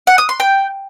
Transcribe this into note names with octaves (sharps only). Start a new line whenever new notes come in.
F#5
D#6
C6
G5